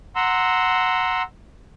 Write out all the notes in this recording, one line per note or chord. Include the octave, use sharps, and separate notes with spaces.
F#5 A#5 C6 E6